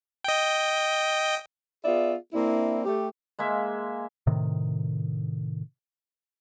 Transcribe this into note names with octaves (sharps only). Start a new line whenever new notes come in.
D#5 G5
B3 F4 G#4 D5 E5
A#3 C4 D4 E4
A3 G4
G#3 A#3 E5
A2 C3 D#3